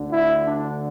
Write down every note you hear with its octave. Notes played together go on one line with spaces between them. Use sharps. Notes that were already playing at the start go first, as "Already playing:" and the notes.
Already playing: D2 D3
E4
D4